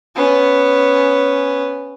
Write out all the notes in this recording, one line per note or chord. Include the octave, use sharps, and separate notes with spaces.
B3 C#4